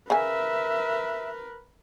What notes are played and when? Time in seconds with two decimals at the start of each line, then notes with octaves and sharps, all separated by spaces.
0.10 C#3 A#4 B4 E5 G#5